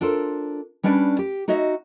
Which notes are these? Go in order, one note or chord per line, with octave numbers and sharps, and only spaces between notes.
D4 F4 A4 A#4 C5
G3 C#4 D4 B4 D5
G4
D#4 F#4 C#5 D#5 E5